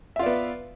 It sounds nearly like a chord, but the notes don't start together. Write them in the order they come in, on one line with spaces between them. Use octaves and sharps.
E5 F4 D5 B3